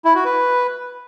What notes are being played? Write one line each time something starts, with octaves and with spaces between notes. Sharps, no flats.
E4
F#4
B4